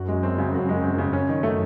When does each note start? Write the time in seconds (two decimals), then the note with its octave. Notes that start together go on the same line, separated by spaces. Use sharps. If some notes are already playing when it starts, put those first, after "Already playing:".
Already playing: F#2 F#4
0.08 G#3
0.23 C4
0.38 C#3
0.54 F#4
0.69 G#3
0.83 C4
0.98 C#3
1.13 F#2 C#4
1.29 D#3
1.43 A3